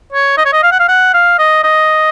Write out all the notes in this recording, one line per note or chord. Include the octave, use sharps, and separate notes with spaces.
C#5
D#5
C#5
D#5
F5
F#5
F5
F#5
F5
D#5
D#5